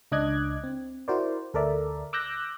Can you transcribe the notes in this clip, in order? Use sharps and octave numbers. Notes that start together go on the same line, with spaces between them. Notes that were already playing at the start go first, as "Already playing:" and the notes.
C#2 D4 D#5 D6 F#6 G#6
C4
E4 F#4 A#4 C5 D5
D2 A4 A#4 D5 E5
D6 E6 F#6 G6 A#6